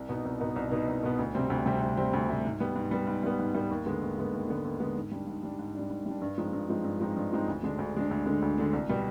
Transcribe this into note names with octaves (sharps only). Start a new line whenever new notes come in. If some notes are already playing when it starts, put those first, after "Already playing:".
Already playing: C2
B2 B3 D#4
C2
B2 B3 D#4
C2
B2 B3 D#4
C2
B2 B3 D#4
D2
C3 G3 C4
D2
C3 G3 C4
D2
C3 G3 C4
D2
C3 G3 C4
G#2
G3 B3
G#2
G3 B3
G#2
G3 B3
G#2
G3 B3
D#2
D3 G#3 B3
D#2
D3 G#3 B3
D#2
D3 G#3 B3
D#2
D3 G#3 B3
G#2
G3 D4
G#2
G3 D4
G#2
G3 D4
G#2
G3 D4
G2
F3 G#3 C4 D#4
G2
F3 G#3 C4 D#4
G2
F3 G#3 C4 D#4
G2
F3 G#3 C4 D#4
D2
D3 G#3 D4
D2
D3 G#3 D4
D2
D3 G#3 D4
D2
D3 G#3 D4
C2
B2 G3